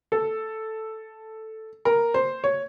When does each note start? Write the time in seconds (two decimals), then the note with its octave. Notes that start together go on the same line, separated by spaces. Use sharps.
0.12 A4
1.85 A#4
2.14 C5
2.44 C#5